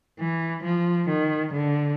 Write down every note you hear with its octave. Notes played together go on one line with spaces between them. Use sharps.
E3
F3
D#3
D3